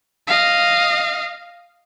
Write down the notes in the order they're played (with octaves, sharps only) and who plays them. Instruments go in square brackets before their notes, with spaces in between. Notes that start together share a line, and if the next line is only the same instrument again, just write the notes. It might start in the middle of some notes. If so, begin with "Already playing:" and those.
[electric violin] D#5 F5